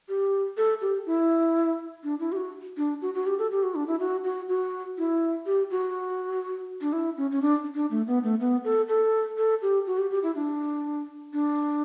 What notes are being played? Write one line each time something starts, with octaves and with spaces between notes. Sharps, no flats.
G4
A4
G4
E4
D4
E4
G4
F#4
D4
F#4
F#4
G4
A4
G4
F#4
D4
E4
F#4
F#4
F#4
E4
G4
F#4
D4
E4
C#4
C#4
D4
D4
A3
B3
A3
B3
A4
A4
A4
G4
F#4
G4
G4
E4
D4
D4